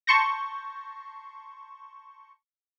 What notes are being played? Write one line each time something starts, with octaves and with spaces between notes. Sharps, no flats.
A5 C6 C#6 G6 A#6